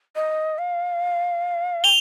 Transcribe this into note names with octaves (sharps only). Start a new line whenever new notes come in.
D#5
F5
G5 F7 G7